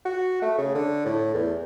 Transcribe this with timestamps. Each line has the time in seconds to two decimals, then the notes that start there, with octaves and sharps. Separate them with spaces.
0.05 F#4
0.42 A3
0.58 C#3
0.75 D3
1.05 A2
1.35 E2